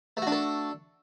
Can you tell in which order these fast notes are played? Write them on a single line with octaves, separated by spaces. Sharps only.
A3 F#4 D4 A4